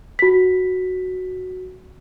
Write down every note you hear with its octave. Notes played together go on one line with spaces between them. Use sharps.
F#4 B6